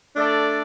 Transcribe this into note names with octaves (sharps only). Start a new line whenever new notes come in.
A3 D4 A4 D5